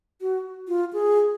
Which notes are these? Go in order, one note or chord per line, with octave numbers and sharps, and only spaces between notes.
F#4
F4
G#4